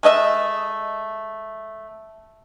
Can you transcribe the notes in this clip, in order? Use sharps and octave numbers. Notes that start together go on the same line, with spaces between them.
G#3 A3 D#5 E5